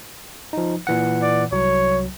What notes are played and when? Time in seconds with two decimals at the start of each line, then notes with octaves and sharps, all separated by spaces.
0.53 F3 D#4
0.87 A#2 E3 F#5
1.22 D5
1.52 C2 F#3 C#5